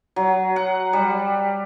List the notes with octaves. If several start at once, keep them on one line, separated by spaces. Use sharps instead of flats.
F#3
F#5
G3